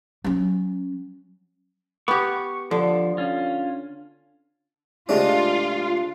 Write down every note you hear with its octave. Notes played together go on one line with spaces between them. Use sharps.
F#3 C#4
B3 G4 C#6
D3 F3
C#4 F4
C3 G#3 A3 D4 F4